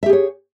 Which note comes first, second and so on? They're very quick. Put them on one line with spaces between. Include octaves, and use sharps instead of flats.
E5 G4 G#4 C#5